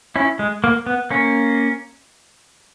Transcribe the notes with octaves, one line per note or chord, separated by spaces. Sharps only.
C#4 E4
G#3
A#3
B3
A#3 C#4